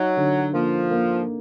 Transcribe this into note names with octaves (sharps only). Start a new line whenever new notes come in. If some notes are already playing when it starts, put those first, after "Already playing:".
Already playing: F#3 D#4
D3
F3 A#3
A#3